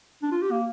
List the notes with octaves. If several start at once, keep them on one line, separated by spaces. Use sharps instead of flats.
D4
F4
G4
A#3